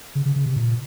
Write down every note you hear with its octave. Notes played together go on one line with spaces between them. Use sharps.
C#3
C#3
C#3
C3
A#2